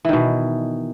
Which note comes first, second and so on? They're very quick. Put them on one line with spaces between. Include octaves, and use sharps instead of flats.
E3 D#3 B2